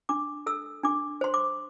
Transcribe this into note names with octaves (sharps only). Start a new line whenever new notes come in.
D4 D6
A4 E6
D4 D6
C5 C6
D6